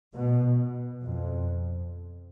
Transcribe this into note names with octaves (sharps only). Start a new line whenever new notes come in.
B2
F2